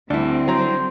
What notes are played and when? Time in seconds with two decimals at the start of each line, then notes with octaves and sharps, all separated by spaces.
0.10 D2 D3 G3 C4 D4 E4
0.48 F#3 C5 A#5